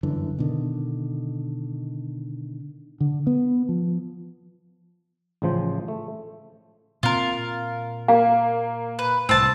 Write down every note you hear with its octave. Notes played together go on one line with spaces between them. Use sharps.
G1 F#2 D3 E3
B2 D3 D#3
D3
B3
F3
A1 C#3 F3 C5
A3
A#2 C4 F4 A#4
A#3 F5
B4
C2 A2 C4 A5